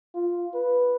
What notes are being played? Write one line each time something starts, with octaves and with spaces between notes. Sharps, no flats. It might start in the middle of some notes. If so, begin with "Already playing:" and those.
F4
B4